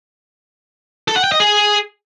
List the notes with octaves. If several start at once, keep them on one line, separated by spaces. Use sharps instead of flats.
A4
F#5
G5
D#5
G#4